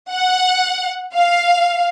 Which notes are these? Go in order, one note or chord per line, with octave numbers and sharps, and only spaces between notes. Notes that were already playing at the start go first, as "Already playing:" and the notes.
F#5
F5